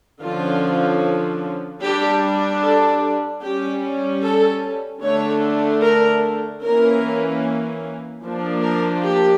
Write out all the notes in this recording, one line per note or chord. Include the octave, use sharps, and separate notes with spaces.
D3 F3 C#4 F4
G3 D4 G4
A4
G3 C#4 G4
A4
D3 A3 D4 C#5
A#4
E3 A#3 C#4 A#4
F3 A#3 D4
A#4
G4